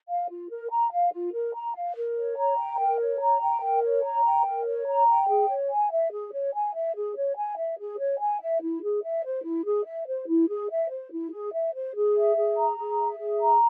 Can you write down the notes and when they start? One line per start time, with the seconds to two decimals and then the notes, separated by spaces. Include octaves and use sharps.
0.09 F5
0.29 F4
0.50 A#4
0.71 A#5
0.92 F5
1.13 F4
1.34 A#4
1.54 A#5
1.75 F5
1.96 A#4
2.17 C#5
2.38 A#5
2.58 G5
2.79 A#4
3.00 C#5
3.21 A#5
3.42 G5
3.62 A#4
3.84 C#5
4.04 A#5
4.25 G5
4.46 A#4
4.66 C#5
4.87 A#5
5.08 G5
5.29 G#4
5.50 C#5
5.71 G#5
5.91 E5
6.12 G#4
6.33 C#5
6.54 G#5
6.75 E5
6.95 G#4
7.16 C#5
7.36 G#5
7.57 E5
7.79 G#4
7.99 C#5
8.20 G#5
8.41 E5
8.61 E4
8.83 G#4
9.03 E5
9.24 C5
9.45 E4
9.66 G#4
9.86 E5
10.07 C5
10.28 E4
10.49 G#4
10.70 E5
10.90 C5
11.12 E4
11.32 G#4
11.53 E5
11.74 C5
11.95 G#4
12.15 E5
12.36 G#4
12.57 A#5
12.77 G#4
12.99 E5
13.19 G#4
13.40 A#5